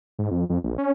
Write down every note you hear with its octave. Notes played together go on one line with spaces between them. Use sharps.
G#2
F2
F2
A#1
C#4